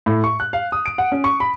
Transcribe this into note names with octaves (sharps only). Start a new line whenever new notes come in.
A2
C#6
F#6
F5
D#6
D7
F#5
C#4
C#6
B5